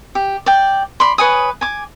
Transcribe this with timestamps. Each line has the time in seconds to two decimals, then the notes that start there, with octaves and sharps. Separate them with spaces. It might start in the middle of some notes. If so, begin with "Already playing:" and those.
0.15 G4
0.46 D5 G5
1.00 D5 B5 C6
1.18 B4 C#5 G#5 D#6
1.61 G#5 D6